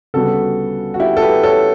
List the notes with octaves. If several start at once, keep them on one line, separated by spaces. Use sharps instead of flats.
D2 C#3 G3 B3 F#4 A4
F#4
E4 G4
A4
G4 B4
A4 C#5